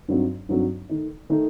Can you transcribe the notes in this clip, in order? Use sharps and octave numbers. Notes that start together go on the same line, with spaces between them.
G2 F#3 C4 D#4
G2 F#3 C4 D#4
D#3 A3 D#4
D#3 A3 D#4